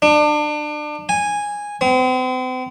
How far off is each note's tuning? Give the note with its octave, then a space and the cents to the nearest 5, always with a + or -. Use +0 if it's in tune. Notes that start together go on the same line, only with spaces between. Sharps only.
D4 +30
G#5 -10
C4 -40